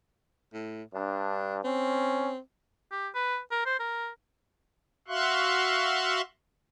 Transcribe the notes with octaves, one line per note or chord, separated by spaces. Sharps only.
A2
G2 D4
C4 C#4
G4
B4
A#4
C5
A#4
F#4 E5 F5 C6 C#6 F#6